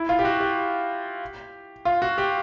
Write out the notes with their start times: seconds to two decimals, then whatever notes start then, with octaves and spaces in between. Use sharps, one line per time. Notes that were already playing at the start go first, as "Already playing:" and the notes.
Already playing: E4
0.09 F4
0.19 G4
0.25 F#4
0.40 G4
1.85 F4
2.02 F#4
2.18 G4